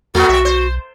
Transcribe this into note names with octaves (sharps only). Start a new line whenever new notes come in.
E2 A3 B3 F#4
B1 C4 E5
C5